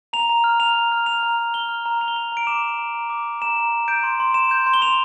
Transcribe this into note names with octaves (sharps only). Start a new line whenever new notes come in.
A#5 F7
A#5
F6
A#5 F7
A#5
F6
F6 F7
A#5
A#5
F6 G7
F6
A#5
A#5 F7
G7
F6 F7
A#5 D7
D6 E7
D6
A#5
A#5
D6
A#5
A#5 E7
A#5
A#5
G6 D7
C6
C6
C6 E7
G6
C6
G7
C6 F7